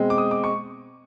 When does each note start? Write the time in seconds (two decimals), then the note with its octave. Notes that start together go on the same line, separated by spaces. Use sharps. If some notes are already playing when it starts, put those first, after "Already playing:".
Already playing: B2 G#3 C4
0.10 D6
0.18 D#6
0.31 D6
0.44 C#6